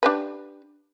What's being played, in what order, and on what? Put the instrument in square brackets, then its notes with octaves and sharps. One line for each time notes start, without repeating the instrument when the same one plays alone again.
[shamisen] D4 G4 B4